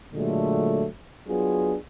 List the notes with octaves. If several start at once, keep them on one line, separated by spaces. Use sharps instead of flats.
A#2 D3 F#3 G#3 A3
F#3 B3 D4 F4 G#4